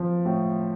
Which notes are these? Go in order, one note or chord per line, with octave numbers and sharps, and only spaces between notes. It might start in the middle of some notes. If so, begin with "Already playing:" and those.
Already playing: F3
A2